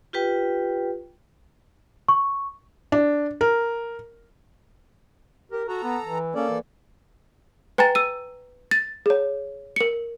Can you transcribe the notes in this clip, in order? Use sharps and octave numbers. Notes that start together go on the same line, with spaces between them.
F4 G4 B4 G5
C#6
D4
A#4
G4 A#4
F#4 A4 A#5
B3
E3
A#3 C#4 A4 D5
E3
B4 G5 G#5 A#5 A6
E6 D#7
A6
G#4 C#5
A#4 C#7